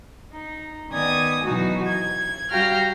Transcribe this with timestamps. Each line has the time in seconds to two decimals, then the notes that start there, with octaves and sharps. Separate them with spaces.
0.33 D#4
0.90 D#3 B3 D5 G#5 D#6 G#6
1.43 B2 E3 F#3 D#4 F#4
1.87 G#6
2.51 G3 F#4 F5 G5 A#5 F6